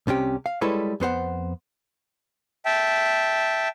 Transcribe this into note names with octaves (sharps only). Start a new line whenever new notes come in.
C2 C3 C#4 G4
F5
G3 G#3 E4 A4 B4 C#5
F2 B3 C5 F#5
E5 G5 A5